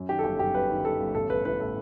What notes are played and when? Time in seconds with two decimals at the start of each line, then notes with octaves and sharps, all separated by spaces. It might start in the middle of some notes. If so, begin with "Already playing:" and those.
Already playing: F#2
0.09 D#3 G4
0.19 A4
0.24 G1 G4
0.39 F#2 G4
0.54 G1 B4
0.70 D#3
0.84 G1 A4
1.00 G1
1.15 A1 A4
1.29 A1 B4
1.45 E3 B4
1.60 A2 A4